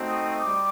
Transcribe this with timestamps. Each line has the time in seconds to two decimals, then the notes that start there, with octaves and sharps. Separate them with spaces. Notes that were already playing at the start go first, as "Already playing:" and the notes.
Already playing: A3 C4 D#4 F#4
0.08 D#6
0.40 G3 D6